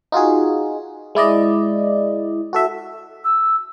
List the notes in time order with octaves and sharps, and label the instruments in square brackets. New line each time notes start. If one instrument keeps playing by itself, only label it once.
[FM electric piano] D#4 F4 F#4 G#4
G#3 E4 D5 D#5
F#4 A4 E5
[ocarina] E6